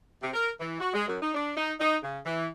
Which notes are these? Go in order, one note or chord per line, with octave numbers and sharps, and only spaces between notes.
C3
A#4
E3
F#4
G#3
F#2
D#4
D4
D#4
D#4
C#3
E3